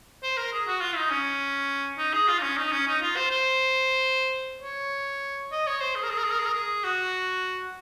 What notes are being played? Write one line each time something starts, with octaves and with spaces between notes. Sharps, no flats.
C5
A#4
G#4
F#4
F4
D#4
C#4
D#4
G#4
F4
D#4
C#4
D#4
C#4
D#4
F4
C5
C5
C#5
D#5
C#5
C5
G#4
A#4
G#4
A#4
G#4
A#4
G#4
A#4
G#4
F#4